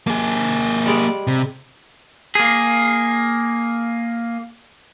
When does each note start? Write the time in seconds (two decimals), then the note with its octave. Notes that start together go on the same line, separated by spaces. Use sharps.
0.07 A#3 G#4
0.85 G3 G#3 D5
1.27 C3
2.35 A#3 G#4